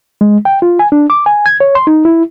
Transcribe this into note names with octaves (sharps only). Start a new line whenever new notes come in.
G#3
G5
F4
G#5
D4
D6
G#5
G#6
C#5
C6
D#4
E4